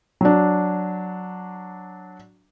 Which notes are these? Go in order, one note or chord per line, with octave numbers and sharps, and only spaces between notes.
F#3 D4